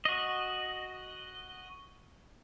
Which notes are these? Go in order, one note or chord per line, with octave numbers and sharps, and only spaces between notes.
F#4 D#5